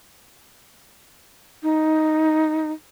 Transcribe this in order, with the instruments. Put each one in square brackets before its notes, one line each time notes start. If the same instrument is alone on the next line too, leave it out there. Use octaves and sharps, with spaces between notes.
[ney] D#4